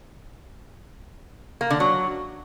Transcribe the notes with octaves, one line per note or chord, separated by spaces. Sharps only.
A#3
D3
F#3